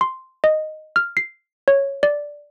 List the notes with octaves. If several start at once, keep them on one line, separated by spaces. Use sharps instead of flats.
C6
D#5
F6
C7
C#5
D5